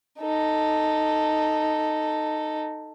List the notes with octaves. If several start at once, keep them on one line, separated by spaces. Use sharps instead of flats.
D#4 A4